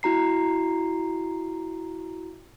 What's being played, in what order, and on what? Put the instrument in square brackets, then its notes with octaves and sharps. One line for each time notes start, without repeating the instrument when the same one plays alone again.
[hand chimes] E4 F#4 A#5 C7